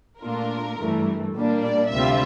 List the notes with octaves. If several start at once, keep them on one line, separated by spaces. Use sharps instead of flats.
A#2 A3 D4 F4 A#4
G2 E3 A3
A#2 G3 A#3 D4
D5
D2 C3 G3 C4 F4 E5